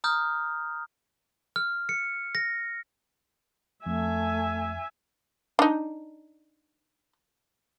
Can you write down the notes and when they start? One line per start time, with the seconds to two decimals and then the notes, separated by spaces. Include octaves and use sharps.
0.04 A#5 D#6 F6 G6
1.56 F6
1.89 C#7
2.35 A#6
3.86 F2 A3 E5 G#5
5.59 D4 D#4